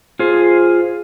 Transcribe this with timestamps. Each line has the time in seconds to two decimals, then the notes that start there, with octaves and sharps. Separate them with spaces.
0.19 F4 G#4 C5